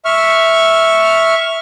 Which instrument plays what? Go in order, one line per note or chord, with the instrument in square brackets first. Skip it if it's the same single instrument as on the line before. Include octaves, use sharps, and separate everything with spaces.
[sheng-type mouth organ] E5 C#6 F6